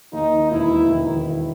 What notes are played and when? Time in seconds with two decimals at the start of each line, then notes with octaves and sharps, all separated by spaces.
0.13 D#2 D#4
0.51 E1 E4
0.89 D#3
1.29 E4